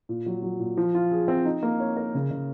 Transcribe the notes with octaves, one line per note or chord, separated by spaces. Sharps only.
A#2
F#3
F#3
A#2
F3
F4
G#4
C4
D#4
A#3
C#5
A#4
C#3
C#3